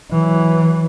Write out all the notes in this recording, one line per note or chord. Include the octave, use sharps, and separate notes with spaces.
E3 F#3